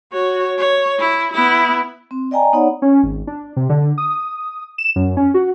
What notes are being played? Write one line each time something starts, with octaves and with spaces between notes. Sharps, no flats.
F#4 C#5
C#5
E4
B3 E4
C4
D5 D#5 G5 G#5 A#5
B3 D#4 C#5 D5 F#5
C#4
G#1
D4
C3
D3
D#6
E7
F#2
C#4
F#4